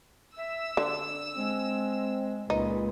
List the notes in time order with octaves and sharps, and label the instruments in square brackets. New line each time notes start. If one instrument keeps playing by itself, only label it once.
[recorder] E5 [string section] E6
[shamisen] D3 [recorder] D4
[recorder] G#3 [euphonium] C4
[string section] C#2 A#2 [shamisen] D#4 [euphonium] B4